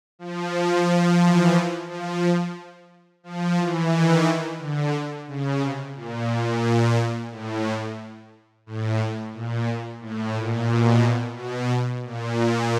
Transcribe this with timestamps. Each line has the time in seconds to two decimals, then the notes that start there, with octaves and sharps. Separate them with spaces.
0.19 F3
0.87 F3
1.21 E3
1.89 F3
3.23 F3
3.58 E3
3.92 D#3
4.59 D3
5.27 C#3
5.60 C3
5.95 A#2
6.29 A#2
6.63 A#2
7.31 A2
8.66 A2
9.34 A#2
10.01 A2
10.35 A#2
10.69 B2
11.37 B2
12.04 A#2